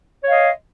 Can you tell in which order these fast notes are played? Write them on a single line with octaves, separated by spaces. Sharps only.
C#5 F5 D#5